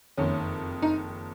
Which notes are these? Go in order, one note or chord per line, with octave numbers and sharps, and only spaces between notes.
F#1 F2 D#3 C#4
D#4